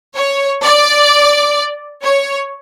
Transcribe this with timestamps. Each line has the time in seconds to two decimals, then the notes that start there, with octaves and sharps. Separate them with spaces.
0.16 C#5
0.63 D5
2.04 C#5